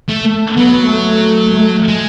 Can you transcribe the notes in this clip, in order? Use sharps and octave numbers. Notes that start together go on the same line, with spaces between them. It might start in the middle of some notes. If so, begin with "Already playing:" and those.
A3
A3
F#3 B3
A3
A3
G#3